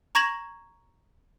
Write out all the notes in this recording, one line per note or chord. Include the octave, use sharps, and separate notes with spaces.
A#5 C#6 G#6 A#6 E7 F#7